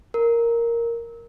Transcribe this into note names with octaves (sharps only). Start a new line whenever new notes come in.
A#4